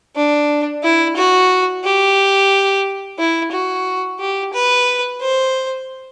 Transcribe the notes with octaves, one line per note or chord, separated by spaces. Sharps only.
D4
E4
F#4
G4
E4
F#4
G4
B4
C5